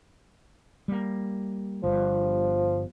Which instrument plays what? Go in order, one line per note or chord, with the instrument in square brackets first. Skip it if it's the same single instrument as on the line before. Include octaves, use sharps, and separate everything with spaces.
[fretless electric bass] G3 A#3
[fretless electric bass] G1 G2 [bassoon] F3